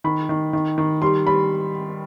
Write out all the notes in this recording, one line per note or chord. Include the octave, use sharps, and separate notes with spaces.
D#3 B5
D#3
D#3
D#3
G3 C6
G3 B5